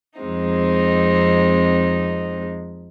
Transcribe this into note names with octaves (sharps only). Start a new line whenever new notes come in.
F2 G#3 C4 D#4